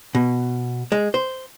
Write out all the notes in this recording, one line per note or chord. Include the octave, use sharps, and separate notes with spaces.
B2
G#3
C5